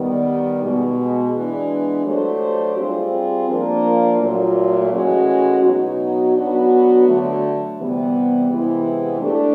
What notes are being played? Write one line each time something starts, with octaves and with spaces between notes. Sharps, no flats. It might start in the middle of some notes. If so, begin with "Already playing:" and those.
Already playing: D#3 G3 B3
B2 G#3 B3
E3 G#3 B3 D4
F#3 A3 D4 G4 C5
G3 C4 F4 G#4
F3 A#3 D4 F4 A#4
A#2 F#3 A3
A2 E3 G#3 C#4 F#4
B2 F#3 B3 D#4 F#4
F#3 B3 D4 F#4 B4
D3 F#3 A3
C3 E3 G3 B3
C3 E3 G#3 B3 E4
A3 D4 G4